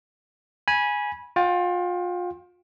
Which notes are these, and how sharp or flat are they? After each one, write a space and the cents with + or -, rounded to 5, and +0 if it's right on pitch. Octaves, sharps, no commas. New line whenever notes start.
G#5 +0 B5 -25
F4 +30 G5 +0